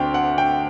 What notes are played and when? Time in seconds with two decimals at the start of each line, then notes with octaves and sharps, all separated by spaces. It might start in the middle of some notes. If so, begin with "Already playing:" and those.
Already playing: D2 D3 C4 G5 C6
0.14 F#5
0.38 G5